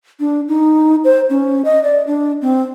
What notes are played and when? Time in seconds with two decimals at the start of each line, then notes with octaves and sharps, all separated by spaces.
0.20 D4
0.48 D#4
1.04 C5
1.30 C#4
1.65 D#5
1.83 D5
2.07 D4
2.42 C4